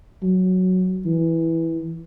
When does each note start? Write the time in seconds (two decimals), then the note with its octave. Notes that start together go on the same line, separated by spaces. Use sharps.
0.22 F#3
1.05 E3